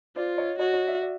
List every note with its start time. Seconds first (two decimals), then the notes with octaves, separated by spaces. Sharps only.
0.16 F4 C5 D5
0.38 C#5 D#5
0.59 F#4 C#5 D#5
0.73 C#5 D#5
0.87 D5 E5
1.02 D5 E5